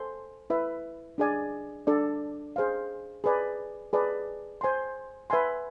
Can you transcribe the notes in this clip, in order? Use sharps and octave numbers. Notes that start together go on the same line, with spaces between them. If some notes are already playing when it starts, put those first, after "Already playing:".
Already playing: A4 C5 G#5 C6
E4 B4 E5
D4 G#4 D5 G#5
D4 A4 D5
G#4 C5 F5
G#4 B4 D5 G#5
G#4 B4 D5 A5
C5 G#5 C6
B4 E5 G#5 C6